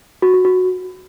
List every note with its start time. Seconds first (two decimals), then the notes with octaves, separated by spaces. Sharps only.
0.22 F#4
0.34 F#4
0.45 F#4